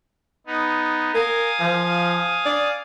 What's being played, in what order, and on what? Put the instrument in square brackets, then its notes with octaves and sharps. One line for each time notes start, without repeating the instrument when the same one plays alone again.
[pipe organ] B3 D#4
[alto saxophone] A#4 [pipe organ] F5 G#5 D#6
[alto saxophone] F3
D5